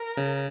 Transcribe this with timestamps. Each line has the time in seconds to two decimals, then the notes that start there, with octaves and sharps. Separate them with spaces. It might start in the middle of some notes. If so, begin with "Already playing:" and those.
Already playing: A#4
0.17 C#3